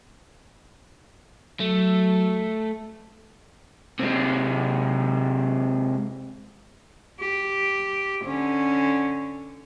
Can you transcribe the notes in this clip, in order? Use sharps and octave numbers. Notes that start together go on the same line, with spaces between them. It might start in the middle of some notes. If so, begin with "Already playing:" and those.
F#3 A3
C3 G#3
G4
D3 C#4